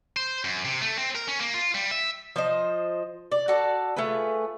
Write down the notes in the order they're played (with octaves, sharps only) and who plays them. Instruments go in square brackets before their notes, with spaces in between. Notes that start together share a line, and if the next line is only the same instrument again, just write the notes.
[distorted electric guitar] C5
F#2
C3
A3
C4
A#4
C#4
A#3
F4
G3
E5
[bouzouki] F3 C5 D#5
D5
F#4 A4 D5
A3 F4 G#4 B4